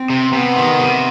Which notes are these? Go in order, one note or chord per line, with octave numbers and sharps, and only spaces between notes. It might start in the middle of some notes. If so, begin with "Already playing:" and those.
Already playing: C4
C3
C3 B3
D#3
C3